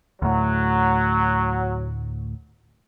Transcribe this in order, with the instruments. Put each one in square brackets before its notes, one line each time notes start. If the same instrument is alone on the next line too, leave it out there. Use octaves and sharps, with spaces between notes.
[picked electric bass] D2 A2 [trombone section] F#3